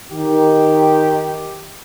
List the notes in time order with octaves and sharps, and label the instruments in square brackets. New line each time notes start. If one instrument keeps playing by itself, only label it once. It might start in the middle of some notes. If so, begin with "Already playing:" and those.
[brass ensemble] D#3 G4